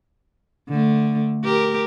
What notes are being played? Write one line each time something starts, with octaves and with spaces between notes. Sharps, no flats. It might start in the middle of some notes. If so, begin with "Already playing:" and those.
D3 A3
G4 A#4